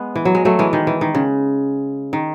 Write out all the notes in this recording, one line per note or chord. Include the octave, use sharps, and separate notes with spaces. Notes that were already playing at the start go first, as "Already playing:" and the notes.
Already playing: G#3 B3
E3
F#3
G#3
F#3 A3
E3 G#3
D#3
E3
D#3
C#3
D#3